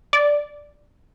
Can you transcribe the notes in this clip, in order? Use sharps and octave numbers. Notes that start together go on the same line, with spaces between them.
D5